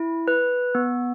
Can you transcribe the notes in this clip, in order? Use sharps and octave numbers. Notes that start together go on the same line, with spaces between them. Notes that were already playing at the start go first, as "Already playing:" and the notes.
Already playing: E4
B4
B3